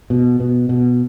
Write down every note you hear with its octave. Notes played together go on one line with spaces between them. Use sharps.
B2
B2
B2